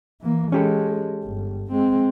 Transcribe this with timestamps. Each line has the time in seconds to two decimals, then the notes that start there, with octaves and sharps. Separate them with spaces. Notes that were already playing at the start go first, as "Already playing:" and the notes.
0.21 E3 A#3
0.52 G#3 C#4 G4 A4
1.25 G1
1.71 G#3 C4